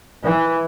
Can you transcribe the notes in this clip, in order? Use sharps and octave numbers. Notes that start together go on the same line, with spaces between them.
E3